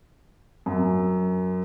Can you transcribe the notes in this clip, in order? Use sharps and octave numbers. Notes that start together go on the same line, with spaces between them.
F#2